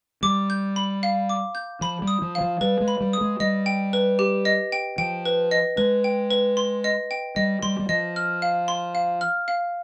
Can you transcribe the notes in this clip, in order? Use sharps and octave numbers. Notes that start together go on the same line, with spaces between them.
G3 D6
G6
B5
F5
D6
G6
F3 B5
G3
D#6
F3
F5
F3
G3 B4
G#3
B5
G3
D#6
G#3
G3 D#5
G5
B4
G4
D#5
G5
F3 G5
B4
D#5
G#3 B4
G5
B4
C6
D#5
G5
G3 D#5
G3 C6
G3
F3 D#5
F6
F5
C6
F5
F6
F5